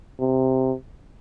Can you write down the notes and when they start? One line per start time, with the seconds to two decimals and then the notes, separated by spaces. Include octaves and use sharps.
0.20 C3